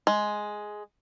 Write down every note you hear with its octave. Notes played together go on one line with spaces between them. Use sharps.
G#3